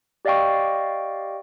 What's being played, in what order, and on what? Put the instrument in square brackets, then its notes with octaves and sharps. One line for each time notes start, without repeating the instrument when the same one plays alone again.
[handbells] G4 D5 D#5 F5 G5 C#6